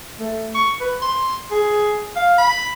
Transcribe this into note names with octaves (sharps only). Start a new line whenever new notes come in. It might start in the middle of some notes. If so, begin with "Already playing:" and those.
A3
C#6
B4
C6
G#4
F5
B5